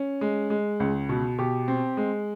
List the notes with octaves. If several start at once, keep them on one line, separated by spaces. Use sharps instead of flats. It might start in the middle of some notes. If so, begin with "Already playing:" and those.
Already playing: C#4
G#3
G#3
C#2
B2
B2 G4
C4
G#3